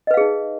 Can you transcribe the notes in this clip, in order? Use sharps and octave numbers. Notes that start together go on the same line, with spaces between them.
D#4 G#4 B4 D#5 F5